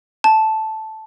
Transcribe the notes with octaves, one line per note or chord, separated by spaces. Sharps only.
A5